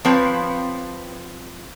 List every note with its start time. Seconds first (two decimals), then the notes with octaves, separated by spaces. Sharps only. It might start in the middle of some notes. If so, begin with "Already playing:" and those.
0.05 F3 C4 B4 C#5